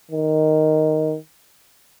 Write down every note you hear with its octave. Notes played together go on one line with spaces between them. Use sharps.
D#3